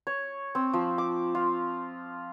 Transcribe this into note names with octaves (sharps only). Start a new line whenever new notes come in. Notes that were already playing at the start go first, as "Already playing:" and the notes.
C#5
C4
F3
D6
F4